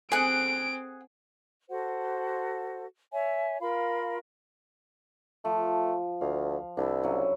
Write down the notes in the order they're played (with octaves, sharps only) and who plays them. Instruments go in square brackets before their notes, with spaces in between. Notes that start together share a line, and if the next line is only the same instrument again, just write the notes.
[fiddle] C4 [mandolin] G#4 F#5 [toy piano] A4 G#5 [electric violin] D7
[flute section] F#4 A4 C5 F#5
C#5 E5 G#5
F4 A#4 F5 B5
[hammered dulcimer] F3 [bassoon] A3
[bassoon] D2 [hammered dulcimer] F5
[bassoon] C2 [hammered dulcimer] D4 E4 E5
[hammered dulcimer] C#3 F#3 E4